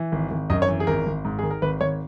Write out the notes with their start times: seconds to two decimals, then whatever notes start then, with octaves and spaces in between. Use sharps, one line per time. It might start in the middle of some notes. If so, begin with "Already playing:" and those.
Already playing: E3
0.12 G#1
0.31 G#1
0.50 F#2 D#5
0.62 C#5
0.68 E3
0.80 G#4
0.87 G#1 A#4
1.06 G#1
1.25 G#2
1.39 D#3 G#4
1.50 A#4
1.62 G#1 B4
1.81 G#1 C#5